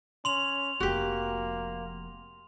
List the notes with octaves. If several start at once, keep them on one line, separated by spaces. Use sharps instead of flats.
C#4 C6 F7 F#7
F1 F3 A#3 F#4 G4